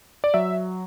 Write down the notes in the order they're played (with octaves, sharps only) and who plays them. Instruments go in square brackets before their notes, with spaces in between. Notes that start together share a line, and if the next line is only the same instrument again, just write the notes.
[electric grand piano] D5
F#3 E5